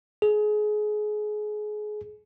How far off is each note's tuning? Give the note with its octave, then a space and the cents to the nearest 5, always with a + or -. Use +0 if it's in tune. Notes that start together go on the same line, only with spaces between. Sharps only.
G#4 +25